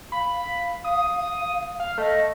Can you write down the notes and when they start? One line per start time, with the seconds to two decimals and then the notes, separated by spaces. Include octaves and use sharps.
0.12 F5 B5
0.84 D#6
1.80 F5
1.98 A3 D#5